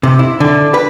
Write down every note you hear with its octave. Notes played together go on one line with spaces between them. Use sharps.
C3
E4
D3
B4